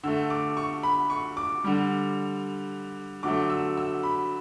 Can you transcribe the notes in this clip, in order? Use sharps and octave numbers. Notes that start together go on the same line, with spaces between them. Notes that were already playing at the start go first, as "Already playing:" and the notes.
D3 A3 E6
D6
C#6
B5
C#6
D6
D3 G3
D3 F#3 A3 D6
E6
E6
B5